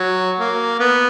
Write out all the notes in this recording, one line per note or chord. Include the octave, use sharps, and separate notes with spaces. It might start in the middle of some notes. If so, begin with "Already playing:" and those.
Already playing: F#3
A#3
B3